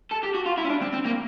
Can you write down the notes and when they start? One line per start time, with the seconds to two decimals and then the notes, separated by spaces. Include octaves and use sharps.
0.11 A4
0.23 G4
0.34 F#4
0.46 F4
0.57 E4
0.65 C#4
0.69 D4
0.82 C4
0.93 C4
1.05 A#3